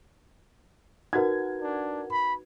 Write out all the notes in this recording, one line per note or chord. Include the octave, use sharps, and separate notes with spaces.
D#4 F#4 A#4 B4 F#5 G#6
D4
B5